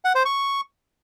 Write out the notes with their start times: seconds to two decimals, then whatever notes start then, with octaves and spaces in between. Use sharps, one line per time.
0.05 F#5
0.15 C5
0.25 C#6